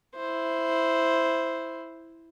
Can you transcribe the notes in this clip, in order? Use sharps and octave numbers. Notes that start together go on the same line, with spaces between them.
E4 C5